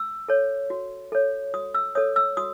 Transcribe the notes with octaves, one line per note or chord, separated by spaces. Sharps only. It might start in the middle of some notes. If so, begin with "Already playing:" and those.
Already playing: E6
A4 C#5
F#4
A4 C#5
F#4 D#6
E6
A4 C#5 D#6
E6
F#4 D#6